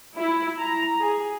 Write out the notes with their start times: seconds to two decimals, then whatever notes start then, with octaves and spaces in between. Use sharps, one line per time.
0.17 E4
0.60 A#5
1.01 G#4